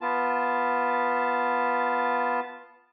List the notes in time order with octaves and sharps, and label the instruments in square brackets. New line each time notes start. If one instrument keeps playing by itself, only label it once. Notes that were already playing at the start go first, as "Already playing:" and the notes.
[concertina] B3 F4 A5